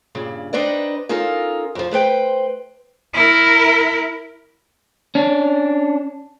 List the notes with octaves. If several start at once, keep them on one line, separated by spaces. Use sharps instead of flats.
G2 A#2 C#3
C4 D4 D#4 B4 D5 D#5
C#4 D#4 F4 A4 A#4
F2 F3
A3 B4 C5 G5
E4 A#4
C#4 D4